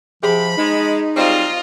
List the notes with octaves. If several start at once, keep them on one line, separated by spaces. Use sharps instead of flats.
C3 F3 G4 G#4 B5
G#3 D#4
F#3 G3 C4 F4 D#5